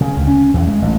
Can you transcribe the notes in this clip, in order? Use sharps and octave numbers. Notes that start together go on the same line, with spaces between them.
C#3
C#2
C#4
E2
G#3
A1